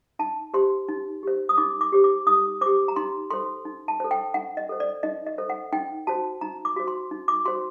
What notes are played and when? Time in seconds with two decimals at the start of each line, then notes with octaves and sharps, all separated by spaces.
0.19 D#4 A5
0.54 G4 C5 C6
0.88 D#4
1.23 G4 C5
1.49 D#6
1.58 D#4 D6
1.81 D6
1.92 G4 C5
2.04 D6
2.27 D#4 D#6
2.61 G4 C5 D6
2.88 A#5
2.96 D#4 C6
3.30 A4 C5 C6
3.65 D#4
3.88 A5
4.00 A4 C5
4.11 G5
4.34 D#4 F#5
4.57 D#5
4.69 A4 C5
4.80 D5
5.03 D#4 D#5
5.26 D#5
5.38 A4 C5
5.50 F#5
5.73 D#4 G5
6.07 F#4 C5 A5
6.41 D#4 A#5
6.65 D6
6.76 F#4 C5
6.88 C6
7.11 D#4
7.28 D6
7.45 F#4 C5 C6